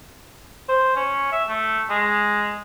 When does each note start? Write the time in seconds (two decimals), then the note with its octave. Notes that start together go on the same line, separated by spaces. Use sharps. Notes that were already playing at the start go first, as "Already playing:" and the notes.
0.68 C5
0.96 C#4
1.32 E5
1.48 A3
1.89 G#3